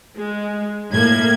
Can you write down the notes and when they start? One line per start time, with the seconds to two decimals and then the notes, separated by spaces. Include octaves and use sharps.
0.16 G#3
0.93 A2 A#3 G#6